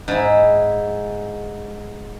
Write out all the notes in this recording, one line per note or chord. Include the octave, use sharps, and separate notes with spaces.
G#2 E4